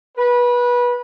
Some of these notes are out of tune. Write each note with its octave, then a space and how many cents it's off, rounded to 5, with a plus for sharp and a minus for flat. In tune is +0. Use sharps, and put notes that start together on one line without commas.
B4 -25